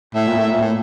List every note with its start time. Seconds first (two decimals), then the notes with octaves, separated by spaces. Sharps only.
0.15 A2 E5
0.27 A#2
0.38 A2
0.50 A#2
0.62 A2